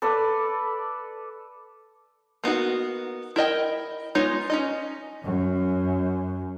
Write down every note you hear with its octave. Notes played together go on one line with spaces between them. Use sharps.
A4 B4 D5
A#3 B3 D#4 F#4
E4 A#4 D#5 G5
G#3 B3 D#4 F4 C#5
C#4 D#4 D#5
F#2